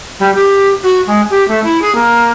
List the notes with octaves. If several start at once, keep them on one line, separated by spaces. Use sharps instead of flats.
G3
G4
F#4
G#3
G4
A3
E4
G#4
A#3